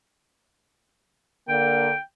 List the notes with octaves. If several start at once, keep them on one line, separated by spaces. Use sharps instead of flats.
D3 A#3 G5